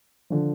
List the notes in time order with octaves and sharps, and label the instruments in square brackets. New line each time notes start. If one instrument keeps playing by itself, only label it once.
[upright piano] D3 F3